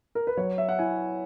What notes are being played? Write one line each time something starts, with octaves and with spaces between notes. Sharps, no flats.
A#4
B4
F#3 C#5
E5
F#5
E4 G#5